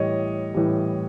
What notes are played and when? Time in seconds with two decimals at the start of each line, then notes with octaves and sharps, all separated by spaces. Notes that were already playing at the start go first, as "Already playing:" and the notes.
Already playing: A2 E3 G3 C#5 D#5
0.54 A2 E3 G3